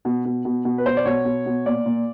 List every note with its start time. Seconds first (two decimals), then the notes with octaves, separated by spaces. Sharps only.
0.05 B2
0.25 B2
0.45 B2
0.65 B2
0.78 B4
0.86 B2 C5
0.97 D5
1.05 B2 C#5
1.25 B2
1.46 B2
1.65 A#2 D5
1.86 A#2